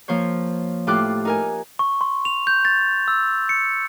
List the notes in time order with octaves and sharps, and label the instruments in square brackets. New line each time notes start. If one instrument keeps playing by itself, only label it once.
[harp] F3 A#3 C5 C#5
A2 F4 G4 D6 F#6
D#4 A#4 G#5
[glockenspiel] C#6
C6
F7
G6
A6
E6
C#7